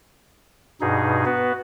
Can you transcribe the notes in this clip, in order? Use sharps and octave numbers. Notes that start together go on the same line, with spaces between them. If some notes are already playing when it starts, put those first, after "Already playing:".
G2 B2 D#4 G#4
B3 F#4 B4